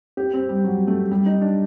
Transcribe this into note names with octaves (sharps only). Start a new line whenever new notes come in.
G4
C4
G3
F#3
A3
G3
D#4
D4